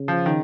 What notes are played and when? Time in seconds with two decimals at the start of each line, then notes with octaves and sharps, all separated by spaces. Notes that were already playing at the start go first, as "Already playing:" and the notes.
Already playing: C#3
0.08 F3
0.26 D#3